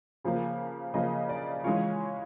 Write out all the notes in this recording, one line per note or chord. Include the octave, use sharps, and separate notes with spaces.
C#3 F3 A#3
C#3 F3 A#3 D#5
D5
E3 G#3 C#4 F4 C#5